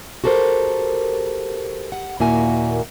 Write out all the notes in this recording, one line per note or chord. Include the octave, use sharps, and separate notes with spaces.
F#4 G4 A4 A#4 C5
F#5
D#2 A#2 A#3 E4 F#4 G#5